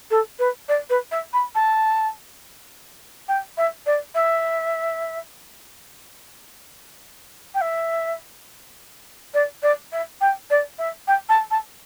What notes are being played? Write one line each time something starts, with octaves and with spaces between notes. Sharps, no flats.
A4
B4
D5
B4
E5
B5
A5
G5
E5
D5
E5
G5
E5
D5
D5
E5
G5
D5
E5
G5
A5
A5